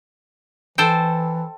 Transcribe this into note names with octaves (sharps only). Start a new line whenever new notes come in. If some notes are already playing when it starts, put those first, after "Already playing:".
E3 A4 C5 G5